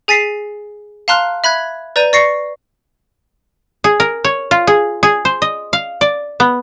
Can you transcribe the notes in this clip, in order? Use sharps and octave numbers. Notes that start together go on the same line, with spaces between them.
G#4 G#5 A6 B6 C7
F5 A5 A#5 C6 F6 F#6
E5 B5 F#6 G#6
B4 D5 A#5 G6 D#7
D5 C#6 A#6 C7 C#7
G#4
A#4
C#5
F4
G#4
G#4
C5
D#5
F5
D5
B3